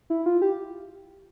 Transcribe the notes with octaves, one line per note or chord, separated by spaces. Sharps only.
E4
F4
G4